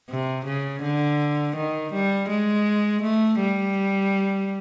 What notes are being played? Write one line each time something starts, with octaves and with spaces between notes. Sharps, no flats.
C3
C#3
D3
D#3
G3
G#3
A3
G3